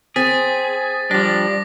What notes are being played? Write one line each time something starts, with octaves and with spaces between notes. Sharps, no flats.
C4 G#4 A6 B6
F3 G3 D4 D6 A#6